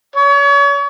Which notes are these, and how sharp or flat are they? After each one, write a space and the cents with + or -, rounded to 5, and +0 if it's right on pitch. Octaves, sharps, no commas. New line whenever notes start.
C#5 +35